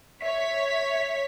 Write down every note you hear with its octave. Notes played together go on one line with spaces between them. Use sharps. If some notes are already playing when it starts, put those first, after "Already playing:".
C#5 E5 B6